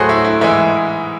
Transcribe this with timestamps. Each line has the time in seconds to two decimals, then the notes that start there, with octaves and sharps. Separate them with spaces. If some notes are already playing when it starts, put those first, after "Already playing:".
Already playing: A2 F#3 A3 F#4 G#4 C5
0.09 E4
0.25 E4
0.41 G#2 E3 G#3 E4